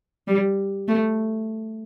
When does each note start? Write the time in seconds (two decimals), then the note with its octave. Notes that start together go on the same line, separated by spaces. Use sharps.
0.28 G3
0.88 A3